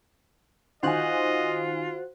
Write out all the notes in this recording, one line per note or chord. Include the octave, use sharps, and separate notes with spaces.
D#3 F4 F#4 C5 D#5 F5 G#5 F#6